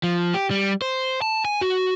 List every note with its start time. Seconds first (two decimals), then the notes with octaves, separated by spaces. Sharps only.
0.03 F3
0.34 G4
0.51 G3
0.82 C5
1.22 A5
1.45 G#5
1.61 F#4